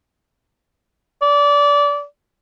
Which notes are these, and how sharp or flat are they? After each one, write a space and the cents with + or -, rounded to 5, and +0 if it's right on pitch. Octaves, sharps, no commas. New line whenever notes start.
D5 -25